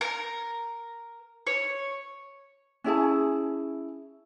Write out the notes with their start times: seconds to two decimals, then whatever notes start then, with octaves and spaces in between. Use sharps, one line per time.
0.01 A#4
1.47 C#5
2.84 C#4 E4 G#4 A5